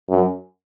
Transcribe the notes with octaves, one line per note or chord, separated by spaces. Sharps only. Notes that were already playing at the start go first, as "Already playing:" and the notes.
F#2